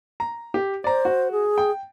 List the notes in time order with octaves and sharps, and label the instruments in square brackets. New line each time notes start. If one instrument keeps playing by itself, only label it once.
[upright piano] A#5
G4
[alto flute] C5 [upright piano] D5 A#5
[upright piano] F#4
[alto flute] G#4
[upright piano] G5